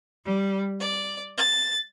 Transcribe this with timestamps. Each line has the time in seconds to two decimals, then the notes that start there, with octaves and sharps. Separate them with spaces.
0.23 G3
0.78 D5
1.37 A6